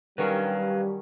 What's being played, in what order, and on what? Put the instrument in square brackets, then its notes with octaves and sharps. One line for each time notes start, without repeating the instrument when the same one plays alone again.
[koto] D#3 F#3 C#4 [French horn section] G3 [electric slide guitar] B4 F5